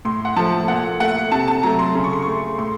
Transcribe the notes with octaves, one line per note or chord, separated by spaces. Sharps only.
A2 C6
F#5
F3 A3 A5
A#2 F#5
A3 F#5
C3 A5
A5
F#3 A3 A#5
C6
C#3
C#6
C6
A3 C#6
A2 C6